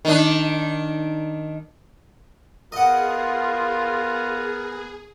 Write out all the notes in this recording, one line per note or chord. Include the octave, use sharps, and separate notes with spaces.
D#3 D4
B3 F4 G#4 A#4 D#5 F#5